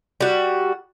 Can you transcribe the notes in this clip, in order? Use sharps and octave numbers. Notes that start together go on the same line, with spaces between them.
G3 F#4